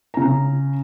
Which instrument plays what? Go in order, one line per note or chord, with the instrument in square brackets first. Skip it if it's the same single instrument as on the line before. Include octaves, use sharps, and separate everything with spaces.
[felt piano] C#3 A#5